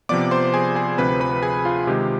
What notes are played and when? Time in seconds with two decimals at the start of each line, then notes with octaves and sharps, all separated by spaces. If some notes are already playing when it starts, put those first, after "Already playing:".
0.09 C3 F3 B3 D5 D6
0.31 C5 C6
0.54 G#4 G#5
0.76 G#4 G#5
0.98 D2 C3 F3 C4 B4 B5
1.20 B4 B5
1.42 G#4 G#5
1.65 F4 F5
1.87 C3 D#3 G#3 G4